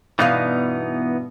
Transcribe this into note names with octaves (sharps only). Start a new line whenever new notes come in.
G2 B2 E3 B3 D#4 F5